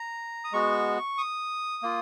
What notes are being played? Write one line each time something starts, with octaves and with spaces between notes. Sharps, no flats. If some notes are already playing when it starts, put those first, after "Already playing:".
Already playing: A#5
D#6
G#3 B3 F#4 C#6
D#6
A#3 F4